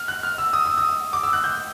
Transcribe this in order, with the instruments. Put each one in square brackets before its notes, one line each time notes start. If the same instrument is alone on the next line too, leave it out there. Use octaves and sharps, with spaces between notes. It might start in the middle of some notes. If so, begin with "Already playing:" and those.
Already playing: [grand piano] F6
F#6
F6
E6
D#6
E6
D#6
D6
E6
F#6
G6